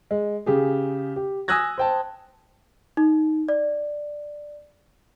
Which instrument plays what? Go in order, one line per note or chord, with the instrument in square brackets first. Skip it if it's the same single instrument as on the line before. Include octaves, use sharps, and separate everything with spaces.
[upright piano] G#3
C#3 G4 G#4
G4
G#5 D#6 E6 F#6 G#6 A#6
C5 G5 A5
[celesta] D#4
D5